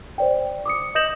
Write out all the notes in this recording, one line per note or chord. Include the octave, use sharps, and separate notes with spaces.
C5 D5 G5
D6 D#6 C#7
D#5 D#6 G6 A#6 E7 F#7